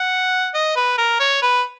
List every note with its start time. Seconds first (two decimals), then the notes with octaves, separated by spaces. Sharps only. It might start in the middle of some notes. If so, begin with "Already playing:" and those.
Already playing: F#5
0.54 D#5
0.76 B4
0.98 A#4
1.20 C#5
1.42 B4